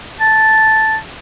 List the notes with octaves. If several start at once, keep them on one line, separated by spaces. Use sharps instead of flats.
A5